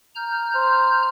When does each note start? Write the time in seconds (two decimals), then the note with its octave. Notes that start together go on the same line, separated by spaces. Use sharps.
0.15 A#5 F6 G6
0.55 C5